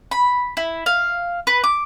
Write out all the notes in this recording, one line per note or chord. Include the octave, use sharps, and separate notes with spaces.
B5
E4
F5
B4
D6